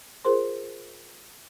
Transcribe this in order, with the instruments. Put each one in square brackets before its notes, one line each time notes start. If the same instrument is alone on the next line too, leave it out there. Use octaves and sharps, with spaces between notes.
[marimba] F4 G#4 A#4 C5 C6